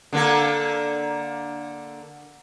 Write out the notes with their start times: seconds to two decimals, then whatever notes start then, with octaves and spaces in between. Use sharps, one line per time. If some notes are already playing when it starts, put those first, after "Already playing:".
0.13 D3 A#3 A4